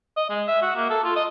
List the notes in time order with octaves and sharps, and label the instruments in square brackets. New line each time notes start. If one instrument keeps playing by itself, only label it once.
[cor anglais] D#5
G#3
E5
F#4
A#3
A4
F4
D#5